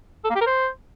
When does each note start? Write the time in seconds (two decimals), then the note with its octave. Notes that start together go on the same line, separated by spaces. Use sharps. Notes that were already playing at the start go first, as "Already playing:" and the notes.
0.24 A4
0.30 A#3
0.35 G4
0.41 A#4
0.46 C5